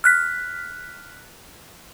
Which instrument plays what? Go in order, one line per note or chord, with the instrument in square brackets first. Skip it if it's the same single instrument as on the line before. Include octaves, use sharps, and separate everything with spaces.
[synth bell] F6 F#6 B6